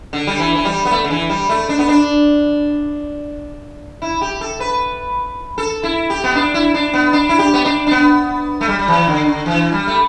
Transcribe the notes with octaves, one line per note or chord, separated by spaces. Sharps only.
D3
G3
E3
E3
G3
B3
A3
D3
E3
G3
A3
D4
B3
D4
E4
G4
A4
B4
A4
E4
G4
B3
D4
E4
D4
B3
D4
E4
G4
B3
D4
D4
B3
A3
G3
G3
E3
D3
D3
E3
G3
A3